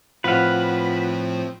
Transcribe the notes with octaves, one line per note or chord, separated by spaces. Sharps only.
A2 F3 C4 F4 B4 F#5 F6